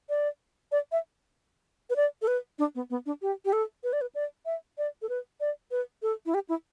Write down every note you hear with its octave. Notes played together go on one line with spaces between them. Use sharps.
D5
D5
E5
B4
D5
A4
B4
D4
B3
B3
D4
G4
G4
A4
B4
D5
B4
D5
E5
D5
A4
B4
D5
B4
A4
E4
G4
E4